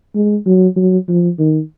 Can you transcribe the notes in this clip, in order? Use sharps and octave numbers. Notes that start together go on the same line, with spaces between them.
G#3
F#3
F#3
F3
D#3